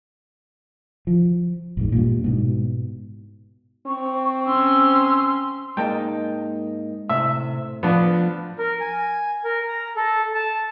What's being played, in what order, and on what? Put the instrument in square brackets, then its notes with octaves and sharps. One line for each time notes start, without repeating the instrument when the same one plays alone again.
[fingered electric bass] F3
A1 E2 G#2
G2 A#2
G#2 B2
[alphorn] C4 [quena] C#6
[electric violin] C#4 C6 [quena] E6
[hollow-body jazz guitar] G#2 A#3 D#4 [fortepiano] G5 A5
[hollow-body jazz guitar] A2 [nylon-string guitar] C3 [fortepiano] E5
[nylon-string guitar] F3 [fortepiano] B3 D4
[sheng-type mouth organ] A#4
G#5
A#4
A#5
A4
A5